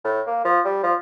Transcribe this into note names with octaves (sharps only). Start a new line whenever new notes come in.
A2
A#3
F3
G3
F3